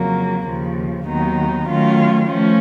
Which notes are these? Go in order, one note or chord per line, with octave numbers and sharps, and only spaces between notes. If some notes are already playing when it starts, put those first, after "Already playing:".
Already playing: F2 C#3 F#3 A#3
D#2 C#3 F3
D#2 D#3 F#3 B3 D#4
D#3 F#3 A3 C#4 F4
F3 A3 C#4